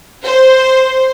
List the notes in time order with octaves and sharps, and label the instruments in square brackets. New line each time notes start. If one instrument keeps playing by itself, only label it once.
[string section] C5